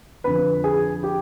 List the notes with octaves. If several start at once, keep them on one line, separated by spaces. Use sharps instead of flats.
F2 D3 F3 B4 B5
G#4 G#5
G4 G5